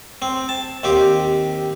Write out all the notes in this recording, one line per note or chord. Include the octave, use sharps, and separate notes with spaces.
C4
A5
D#2 C4 G4